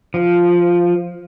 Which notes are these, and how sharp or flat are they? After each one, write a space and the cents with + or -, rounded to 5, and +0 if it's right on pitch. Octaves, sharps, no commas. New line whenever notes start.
F3 +0